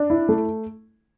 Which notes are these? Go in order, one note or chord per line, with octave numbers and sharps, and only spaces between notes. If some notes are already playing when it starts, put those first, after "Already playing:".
Already playing: D4
E4
A3